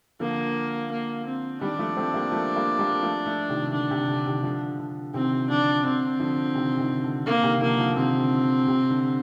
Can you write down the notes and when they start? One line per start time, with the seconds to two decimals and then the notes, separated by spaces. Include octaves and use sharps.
0.20 D3 F3 A#3
0.91 A#3
1.26 C4
1.61 D#3 G3 D4
1.79 F3 A3
1.97 A3 C4
2.14 G3 A#3
2.32 F3 A3
2.56 G3 A#3
2.79 G3 A#3
3.02 F3 A3
3.26 F3 A3
3.50 C3 D#3
3.73 D3 D4
3.91 C3
4.08 D3
4.26 C3 D#3
4.43 D3 F3
4.79 D3
5.14 C3 D#3 C4
5.49 D3 F3 D4
5.85 D3 C4
6.20 D3 F3
6.55 C3 D#3
6.78 C3 D#3
7.03 D3
7.26 D3 A#3
7.43 C3 D#3
7.61 D3 F3 A#3
7.79 D3 F3
7.97 C3 D#3 C4
8.20 D3
8.43 D3
8.68 C3
8.90 D3